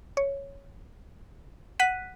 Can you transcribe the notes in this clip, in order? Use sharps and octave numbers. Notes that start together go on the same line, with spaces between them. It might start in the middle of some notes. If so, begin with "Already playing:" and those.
C#5
F#5 F#6 B6 D#7